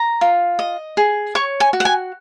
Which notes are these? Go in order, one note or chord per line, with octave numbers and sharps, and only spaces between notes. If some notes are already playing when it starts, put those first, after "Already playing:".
Already playing: A#5
F4
D#5
G#4
C#5 C#6
G#5
F#4
F#5
G#5